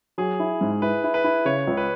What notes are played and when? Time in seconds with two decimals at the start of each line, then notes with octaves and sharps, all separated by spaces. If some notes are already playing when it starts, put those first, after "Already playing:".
0.18 F#3 G#4
0.40 E4
0.61 G#2
0.82 E4 B4
1.04 E4
1.14 B4
1.24 E4
1.45 C#3 C#5
1.67 C#2
1.77 B4